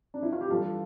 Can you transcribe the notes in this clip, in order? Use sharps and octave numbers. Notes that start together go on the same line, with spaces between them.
D4
E4
F4
G4
G2 E3 G3 F4 A4